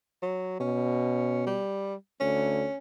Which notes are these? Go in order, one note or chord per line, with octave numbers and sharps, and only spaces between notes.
F#3
B2 C#4
G3
D2 C#4